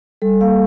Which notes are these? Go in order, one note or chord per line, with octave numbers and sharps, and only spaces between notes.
G3 A4
A#3 F5